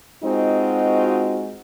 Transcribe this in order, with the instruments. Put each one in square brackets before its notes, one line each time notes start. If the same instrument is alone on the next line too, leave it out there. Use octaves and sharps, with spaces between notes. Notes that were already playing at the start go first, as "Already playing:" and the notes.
[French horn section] G#3 C4 D#4 F4 F#4